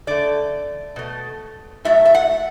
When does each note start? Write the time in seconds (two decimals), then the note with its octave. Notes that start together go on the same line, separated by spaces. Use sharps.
0.07 D3 A3 D5
0.96 B2 A3
1.85 A2 F#3 A3 E5
2.05 E5
2.15 F#5